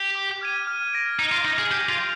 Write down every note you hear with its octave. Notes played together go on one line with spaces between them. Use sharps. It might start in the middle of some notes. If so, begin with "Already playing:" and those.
Already playing: G4
D6
F6 G#6 D#7
F6
A#6 D7
D#4 F6
F4
D#4 A#6 D7
G#4
G4 G6
F4
A#6 D7 F7